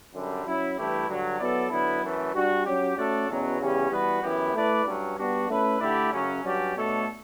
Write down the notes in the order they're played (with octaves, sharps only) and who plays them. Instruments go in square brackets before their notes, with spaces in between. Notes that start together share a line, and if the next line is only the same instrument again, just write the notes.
[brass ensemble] F#2 D3 G3
F#3 C#4 E4
G2 E3 A3 E4 G4
G2 D3 F#3
F#3 B3 E4 A4 D5
D3 F#3 B3 E4
F#2 E3 A3
G3 D4 F#4
F#3 C#4 G4
A3 C#4 F#4 A4 D5
E2 B2 F#3 C#4
E2 C#3 G3 C#4 G4
E3 G3 B3 F#4 B4
F#2 E3 B3 E4 G4
A3 E4 B4 D5
G2 F#3 C#4
G3 B3 D4 F#4
A3 C#4 E4 B4
D3 A3 E4 G4 D5
F#2 C#3 F#3 C#4
G2 F#3 C#4 G4 D5
B2 A3 D4 A4 C#5